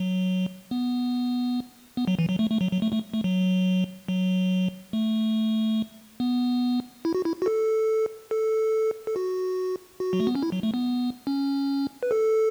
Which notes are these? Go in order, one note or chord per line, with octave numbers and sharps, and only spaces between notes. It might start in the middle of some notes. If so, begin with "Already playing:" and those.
Already playing: F#3
B3
B3
F#3
E3
F#3
A3
A3
F#3
F#3
A3
A3
A3
F#3
F#3
A3
B3
E4
F#4
E4
F#4
A4
A4
A4
F#4
F#4
F#3
A3
B3
C#4
E4
F#3
A3
B3
C#4
B4
A4